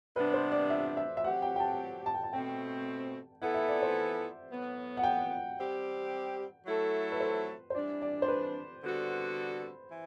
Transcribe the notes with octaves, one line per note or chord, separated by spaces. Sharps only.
C3 G3 B3 D4 B4
C5
D5
E5
E5
E5
F#3 C4 G4 F#5
G5
G5
A5
A5
G5
A5
B2 A3 C4 G5
E3 B3 E4 A4 F#5
E5
D5
C5
A2 F#3 B3
F#5
G5
G3 C4 G4
F#3 A3 E4 A4
B4
C5
C5
E3 G3 D4 D5
D5
C5
B4
D3 G3 B3 F#4 A4
E3